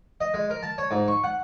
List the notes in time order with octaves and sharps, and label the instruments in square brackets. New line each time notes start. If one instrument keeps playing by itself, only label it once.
[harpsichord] D#5
G#3
A#4
A5
C#5
G#2
C#6
F#5